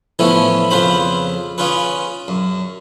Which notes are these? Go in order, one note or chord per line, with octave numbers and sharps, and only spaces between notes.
A2 E3 F3 A3 B3 C#4
F2 C#3 F4 B4 C5 B5
C#4 F4 G#4 B4
F#2